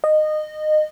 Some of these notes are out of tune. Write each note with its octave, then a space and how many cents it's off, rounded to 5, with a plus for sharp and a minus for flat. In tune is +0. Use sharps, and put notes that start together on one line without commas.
D#5 -20